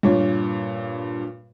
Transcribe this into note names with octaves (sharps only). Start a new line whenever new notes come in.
G2 A#2 C#5